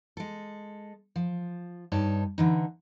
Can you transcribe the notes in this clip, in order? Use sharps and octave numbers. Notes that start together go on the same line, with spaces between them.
G#3 A4
F3
G2 D#4 C#5 A5
D3 E3 D#4